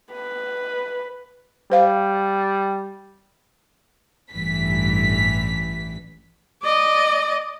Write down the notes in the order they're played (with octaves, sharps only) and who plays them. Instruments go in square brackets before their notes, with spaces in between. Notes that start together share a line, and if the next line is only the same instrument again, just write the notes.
[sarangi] B4
[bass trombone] G3 [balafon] C5 F5
[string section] A1 G2 E3 B6
[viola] D5 D#5